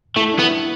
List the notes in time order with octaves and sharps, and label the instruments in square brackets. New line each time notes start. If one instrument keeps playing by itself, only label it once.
[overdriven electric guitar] A3 [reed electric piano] E4
[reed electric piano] D4
[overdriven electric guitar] B3 [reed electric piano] E4